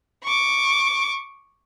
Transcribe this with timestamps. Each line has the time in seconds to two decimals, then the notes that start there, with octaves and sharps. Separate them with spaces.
0.24 C#6 D6